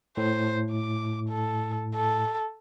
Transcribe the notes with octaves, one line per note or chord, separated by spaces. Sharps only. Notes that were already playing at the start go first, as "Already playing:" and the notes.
A2 C5
D6
A4
A4